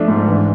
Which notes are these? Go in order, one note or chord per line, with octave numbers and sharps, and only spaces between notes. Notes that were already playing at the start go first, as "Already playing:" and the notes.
Already playing: F3 A3 D4
G#2
E3